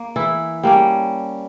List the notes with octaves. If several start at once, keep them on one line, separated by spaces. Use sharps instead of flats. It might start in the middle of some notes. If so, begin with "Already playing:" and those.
Already playing: A#3
E3 E4
G3 A#3 C#4